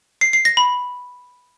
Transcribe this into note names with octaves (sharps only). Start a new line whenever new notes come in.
C7
C7
A#6
B5